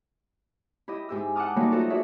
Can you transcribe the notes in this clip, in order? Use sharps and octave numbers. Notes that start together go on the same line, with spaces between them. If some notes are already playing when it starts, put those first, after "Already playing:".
E4 G4 D#5
G#2 G4 E6
F#5 G5 A5 D6 D#6 F6
F#3 G3 A3 A#3 D#4 E4
F4 F#4 A4 C5 D#5
F#4 G#4 C#5 D5 E5